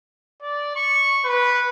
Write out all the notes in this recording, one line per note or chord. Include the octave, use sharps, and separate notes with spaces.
D5
C#6
B4